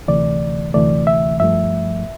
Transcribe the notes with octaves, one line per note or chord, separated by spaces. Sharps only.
D2 C3 E3 A3 D5
D2 C3 E3 A3 D5
E5
G2 F3 A3 E5